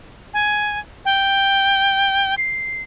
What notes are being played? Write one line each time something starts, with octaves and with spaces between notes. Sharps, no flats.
G#5
G5
C7